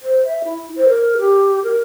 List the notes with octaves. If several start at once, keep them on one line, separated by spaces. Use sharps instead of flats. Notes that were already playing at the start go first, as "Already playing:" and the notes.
C5
E5
E4
C5
A#4
G4
A#4